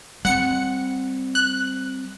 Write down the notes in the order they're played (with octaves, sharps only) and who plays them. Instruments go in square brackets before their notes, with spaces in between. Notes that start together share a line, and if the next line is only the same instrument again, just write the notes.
[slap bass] G3 A3 C4 [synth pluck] F#5 C#7
[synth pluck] F#6